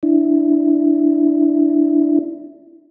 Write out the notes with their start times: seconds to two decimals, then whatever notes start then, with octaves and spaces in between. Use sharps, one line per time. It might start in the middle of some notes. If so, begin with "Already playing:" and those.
0.03 D4 E4